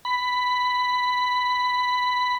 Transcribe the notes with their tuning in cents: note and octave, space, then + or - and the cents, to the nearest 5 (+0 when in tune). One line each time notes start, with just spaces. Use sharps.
B5 +10